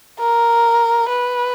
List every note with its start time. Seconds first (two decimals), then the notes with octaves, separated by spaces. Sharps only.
0.19 A#4
1.09 B4